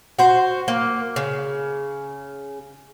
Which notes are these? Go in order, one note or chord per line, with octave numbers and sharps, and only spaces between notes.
F#4 C5
A#3
C#3